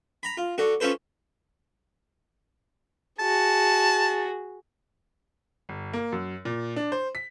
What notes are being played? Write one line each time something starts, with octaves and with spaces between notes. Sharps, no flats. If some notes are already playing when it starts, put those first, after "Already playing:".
A#5 B5
F4
D3 F#4
C#4 F4 A4 B4 C5
F#4 G#4 A5
G1
A#3
F#2
A#2
D4
C5
B6